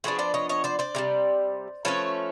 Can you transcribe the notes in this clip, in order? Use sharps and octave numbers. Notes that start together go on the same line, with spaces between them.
F3 G#3 B3 D4 F#4 G#4
C5 D5
C#5 D#5
C#5 D#5
C5 D5
C5 D5
C3 D#3 G3
F3 A3 C#4 B4 C#5